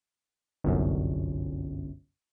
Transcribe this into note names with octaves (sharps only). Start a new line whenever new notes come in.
G1 C2 F#2